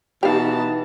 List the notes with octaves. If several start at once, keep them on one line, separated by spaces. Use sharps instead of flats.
B2 E3 D#4 G4 F5 A5